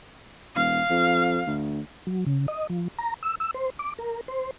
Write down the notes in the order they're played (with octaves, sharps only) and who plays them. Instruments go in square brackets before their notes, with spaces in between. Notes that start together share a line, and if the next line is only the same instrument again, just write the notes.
[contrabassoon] E1 [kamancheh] F5
[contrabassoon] F2
D2
[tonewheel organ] F#3
C#3
D#5
F3
A#5
E6
E6
C5
D6
A#4
C5